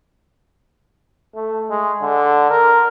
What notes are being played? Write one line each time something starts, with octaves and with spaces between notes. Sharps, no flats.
A3
G#3
D3
A#4